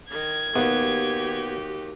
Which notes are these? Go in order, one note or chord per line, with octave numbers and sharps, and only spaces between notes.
D#3 G#6
D#2 B3 F#4 G4